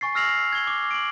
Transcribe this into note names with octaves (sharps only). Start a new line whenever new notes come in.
G#5 C#6 A6 C7
E6 F6 A#6 C7 F7 F#7
G#6 G7
D6
D7 F#7